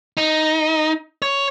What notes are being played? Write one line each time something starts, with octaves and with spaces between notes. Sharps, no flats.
D#4
C#5